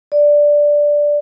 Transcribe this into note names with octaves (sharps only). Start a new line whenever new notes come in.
D5